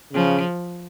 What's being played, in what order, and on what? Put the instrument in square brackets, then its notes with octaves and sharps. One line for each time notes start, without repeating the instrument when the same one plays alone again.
[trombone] C#3 [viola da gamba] F3